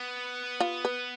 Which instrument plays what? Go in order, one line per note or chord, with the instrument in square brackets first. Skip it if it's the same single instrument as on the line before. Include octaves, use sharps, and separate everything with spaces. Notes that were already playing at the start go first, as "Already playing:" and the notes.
Already playing: [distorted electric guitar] B3
[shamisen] F4
B4